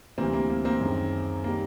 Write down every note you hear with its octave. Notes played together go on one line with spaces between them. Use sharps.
D2 C3 E3 G3 A#3 C4
A#3
A#3
A#3 C4
F#2 D#3 G#3
D#3 G3 A#3